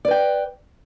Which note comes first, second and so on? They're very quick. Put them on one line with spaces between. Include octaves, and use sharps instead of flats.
D5 B4 G5